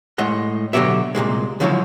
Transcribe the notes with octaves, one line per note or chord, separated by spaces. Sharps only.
A2 G#3 D#5 F#5
B2 D3 F#3 F#4 G4 E5
C2 F#2 A#2 G#3
C#2 D3 F3 F#3 E4 C#5